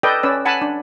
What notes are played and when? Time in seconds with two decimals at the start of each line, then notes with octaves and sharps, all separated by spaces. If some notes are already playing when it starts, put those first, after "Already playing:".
0.03 A4 B4 D5 D#5 G5
0.23 C#4 B4 D5 E6
0.45 F#5 G#5 A5 B5
0.62 D4